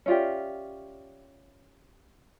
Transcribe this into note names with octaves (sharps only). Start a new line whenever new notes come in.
C#4 F4 G4 C#5 D5 E5